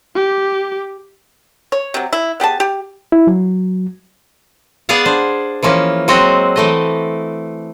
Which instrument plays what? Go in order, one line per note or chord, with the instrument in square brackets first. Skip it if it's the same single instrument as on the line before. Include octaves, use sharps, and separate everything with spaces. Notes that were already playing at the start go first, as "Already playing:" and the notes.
[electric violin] G4
[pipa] C#5
C3 F#3
E4
B3 G4 G#4 A5
G4
[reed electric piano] E4
F#3
[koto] B3 G#4 D5 F5 F#5
D4 C5
E3 F3 A#3 C#4
F#3 G#3 C4 F#4 D#5
E3 A3 D#5